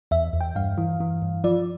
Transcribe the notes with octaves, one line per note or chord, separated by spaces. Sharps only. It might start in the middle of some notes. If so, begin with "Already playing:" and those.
E2 E5
E2
G5
G2 F5
E3
E3
G2
F3 D5